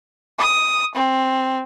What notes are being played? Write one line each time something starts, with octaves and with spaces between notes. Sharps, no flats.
D#6
C4